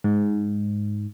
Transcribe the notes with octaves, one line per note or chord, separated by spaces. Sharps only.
G#2